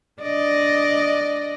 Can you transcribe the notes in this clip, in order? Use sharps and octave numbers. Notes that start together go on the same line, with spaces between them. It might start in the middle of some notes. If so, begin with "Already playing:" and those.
D4 D5 D#5